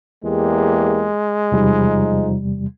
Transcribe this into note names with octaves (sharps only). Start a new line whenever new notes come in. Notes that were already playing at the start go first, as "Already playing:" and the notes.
E2 G#3 A#3 G4
E2 C3 F3 G3 D#4